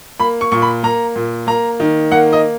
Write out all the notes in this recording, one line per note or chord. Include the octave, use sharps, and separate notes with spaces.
A#3 B5
C#6
A#2 C#6
B5
A#3 A#5
A#2
A#3 A#5
D#3
A#3 F#5
D#5